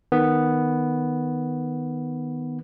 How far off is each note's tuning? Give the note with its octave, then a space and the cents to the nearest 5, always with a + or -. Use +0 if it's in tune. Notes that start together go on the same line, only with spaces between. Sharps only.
D#3 +0 B3 +0